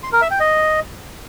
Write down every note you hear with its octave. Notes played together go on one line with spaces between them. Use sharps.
C6
A#4
E5
G5
D#5